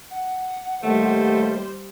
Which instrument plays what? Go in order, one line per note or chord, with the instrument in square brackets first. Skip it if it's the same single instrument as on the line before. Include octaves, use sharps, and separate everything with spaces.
[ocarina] F#5
[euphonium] D#2 [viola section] G3 C5 [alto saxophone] A3